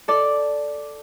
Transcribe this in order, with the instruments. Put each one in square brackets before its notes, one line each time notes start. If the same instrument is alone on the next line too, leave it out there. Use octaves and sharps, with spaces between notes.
[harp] A4 D5